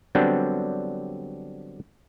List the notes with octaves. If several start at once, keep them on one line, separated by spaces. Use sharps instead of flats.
D3 F#3 G3 B3 C4 D4